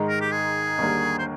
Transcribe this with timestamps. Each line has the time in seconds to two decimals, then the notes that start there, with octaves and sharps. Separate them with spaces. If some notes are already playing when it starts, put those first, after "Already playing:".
Already playing: G#2 D#3 G#3 D#4
0.09 A#4
0.21 G4
0.32 G#4
0.78 D#2 D3 G3 A#3
1.18 C5